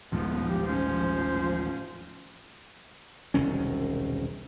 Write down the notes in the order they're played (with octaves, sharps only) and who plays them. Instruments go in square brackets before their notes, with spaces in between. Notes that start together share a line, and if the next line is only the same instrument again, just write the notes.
[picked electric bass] D#1 A1 G#2 [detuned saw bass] F3 [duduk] B3
[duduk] G4
[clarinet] C#4 [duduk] C5
[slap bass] E1 C2 D#3 C#4